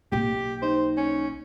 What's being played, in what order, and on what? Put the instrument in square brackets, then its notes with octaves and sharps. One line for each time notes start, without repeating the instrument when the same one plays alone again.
[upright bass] B1 A#3 [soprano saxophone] G4
[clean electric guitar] D#4 [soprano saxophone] C5
[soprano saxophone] C#4